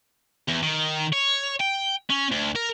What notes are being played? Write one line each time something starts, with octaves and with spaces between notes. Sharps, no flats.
E2
D#3
C#5
G5
C#4
D2
A#4